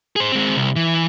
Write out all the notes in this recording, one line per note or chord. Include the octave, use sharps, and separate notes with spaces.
G#4 C5
G#3 C4
C2
E3